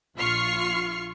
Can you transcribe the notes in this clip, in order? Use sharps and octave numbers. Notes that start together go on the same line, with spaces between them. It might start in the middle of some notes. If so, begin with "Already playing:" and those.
A#1 F4 C#6 F6 C7